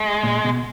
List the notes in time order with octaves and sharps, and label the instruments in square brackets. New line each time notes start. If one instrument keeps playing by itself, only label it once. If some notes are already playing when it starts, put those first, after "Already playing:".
Already playing: [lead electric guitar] G#3
[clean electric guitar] A#2
B2